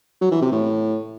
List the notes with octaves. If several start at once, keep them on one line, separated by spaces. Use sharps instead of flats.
F#3
E3
C3
A2